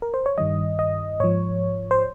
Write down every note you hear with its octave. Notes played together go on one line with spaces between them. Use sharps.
A#4
C5
C#5
G2 D#3 G3 D#5
D#5
G#2 F3 C#5
C5